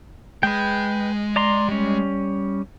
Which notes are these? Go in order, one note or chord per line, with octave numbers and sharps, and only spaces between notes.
G#3 B4 G5
D5 A#5 C6
G3 C#4